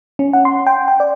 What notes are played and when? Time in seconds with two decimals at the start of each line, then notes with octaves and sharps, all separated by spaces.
0.19 C#4
0.33 F#5
0.45 C6
0.67 G5
0.88 G5
1.00 D5